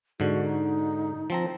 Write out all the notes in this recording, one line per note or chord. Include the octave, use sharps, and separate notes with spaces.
G#2 D3 F#4
D#4
F3 C4 A#5